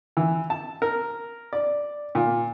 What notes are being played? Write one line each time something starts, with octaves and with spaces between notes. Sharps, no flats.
E3
A5
A#4
D5
A#2